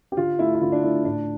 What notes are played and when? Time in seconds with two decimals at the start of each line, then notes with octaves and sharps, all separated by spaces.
0.12 G4
0.17 D3 F4
0.39 A3 E4
0.55 E4
0.61 D3 F4
0.72 D4
0.83 A3 E4
1.05 A2 D4